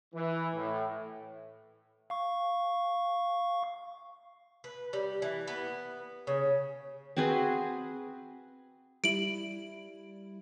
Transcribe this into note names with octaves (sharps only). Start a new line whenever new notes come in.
E3
A2
F5 C#6
B4
G3
E3
B3
C#3
C4 F#4 G#4 B4
G3 E4 D7 F#7